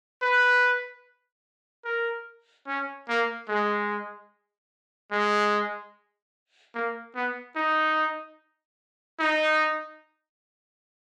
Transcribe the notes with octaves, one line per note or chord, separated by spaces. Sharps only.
B4
A#4
C#4
A#3
G#3
G#3
A#3
B3
D#4
D#4